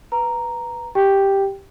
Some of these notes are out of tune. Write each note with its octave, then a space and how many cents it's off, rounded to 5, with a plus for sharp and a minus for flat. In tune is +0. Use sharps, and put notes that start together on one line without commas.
B4 +0 A#5 +0
G4 +0 G5 +0